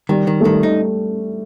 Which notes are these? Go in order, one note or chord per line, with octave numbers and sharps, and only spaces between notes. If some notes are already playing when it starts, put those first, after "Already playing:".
D#3 G3
D#3
A3
D#3 G3
D#4